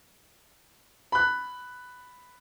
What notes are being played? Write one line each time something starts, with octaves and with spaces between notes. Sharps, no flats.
B5 F#6